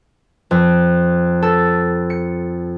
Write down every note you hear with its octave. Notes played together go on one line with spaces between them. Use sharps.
F2
A4
C#7